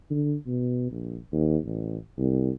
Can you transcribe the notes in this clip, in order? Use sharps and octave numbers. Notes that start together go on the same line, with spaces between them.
D3
B2
A#1
D#2
A1
C2